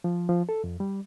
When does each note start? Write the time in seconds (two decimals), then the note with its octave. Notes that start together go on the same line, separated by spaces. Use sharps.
0.04 F3
0.29 F3
0.49 A4
0.64 F2
0.80 G3